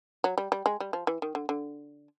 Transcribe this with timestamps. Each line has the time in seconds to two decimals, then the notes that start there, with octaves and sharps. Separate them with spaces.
0.24 F#3
0.38 G3
0.52 G3
0.66 G#3
0.80 G3
0.93 F3
1.07 E3
1.22 D#3
1.35 D3
1.49 D3